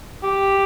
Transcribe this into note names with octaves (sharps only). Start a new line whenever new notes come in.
G4